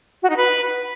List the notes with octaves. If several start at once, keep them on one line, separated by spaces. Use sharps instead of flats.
F#4
D#4
B4